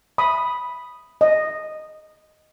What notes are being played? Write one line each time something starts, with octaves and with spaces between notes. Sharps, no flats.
B5 D#6
D#5